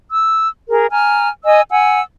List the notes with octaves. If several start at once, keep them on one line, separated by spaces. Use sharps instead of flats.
E6
G#4 A#4
G#5 A#5 F6
D#5 G#5 E6
F#5 G#5 E6